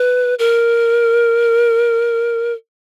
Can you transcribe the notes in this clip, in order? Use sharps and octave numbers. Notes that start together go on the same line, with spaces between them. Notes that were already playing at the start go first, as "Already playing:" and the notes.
Already playing: B4
A#4